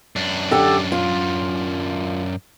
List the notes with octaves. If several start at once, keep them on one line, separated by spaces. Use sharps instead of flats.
F#2 D4
D3 G4 A4
F4